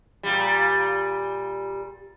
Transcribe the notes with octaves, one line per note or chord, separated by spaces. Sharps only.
A#2 G3